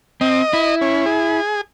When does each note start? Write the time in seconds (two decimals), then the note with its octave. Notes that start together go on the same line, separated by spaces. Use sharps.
0.21 C4 D#5
0.53 E4
0.81 C#4
1.06 G#4